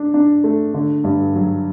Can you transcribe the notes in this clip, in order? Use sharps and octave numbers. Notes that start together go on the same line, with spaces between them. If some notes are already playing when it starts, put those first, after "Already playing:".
Already playing: D4
D4
A3
D3
G2
F#3